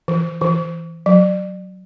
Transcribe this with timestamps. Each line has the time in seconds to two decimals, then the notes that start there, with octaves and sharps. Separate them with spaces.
0.08 E3
0.41 E3
1.06 F#3